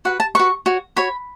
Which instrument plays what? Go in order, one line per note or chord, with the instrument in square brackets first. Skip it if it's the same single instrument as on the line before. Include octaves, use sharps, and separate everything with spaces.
[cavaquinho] F#4 B4 F#5
A5
F#4 B4 C#6
F#4 C#5
F#4 C#5 B5